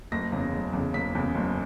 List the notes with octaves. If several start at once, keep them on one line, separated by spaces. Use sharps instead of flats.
F#1 A#6
E2 C#3
F#1
E2 C#3
F#1 B6
E2 C#3
F#1